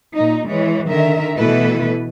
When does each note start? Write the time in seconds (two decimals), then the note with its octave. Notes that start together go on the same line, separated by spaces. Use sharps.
0.16 A#2 D#4
0.48 E3 G#3 C#5
0.88 D3 D#3 A#4 E5
1.36 B2 E3 A3 E4 A4 B4